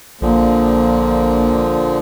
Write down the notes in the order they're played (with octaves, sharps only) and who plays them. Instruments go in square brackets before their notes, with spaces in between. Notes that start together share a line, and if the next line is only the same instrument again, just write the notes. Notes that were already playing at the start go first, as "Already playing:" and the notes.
[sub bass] A#1 [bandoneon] A#2 D3 F3 [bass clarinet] A#3